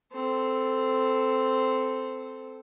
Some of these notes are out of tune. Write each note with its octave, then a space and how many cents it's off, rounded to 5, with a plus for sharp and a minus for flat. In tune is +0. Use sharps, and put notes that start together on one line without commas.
C4 -10 A4 +0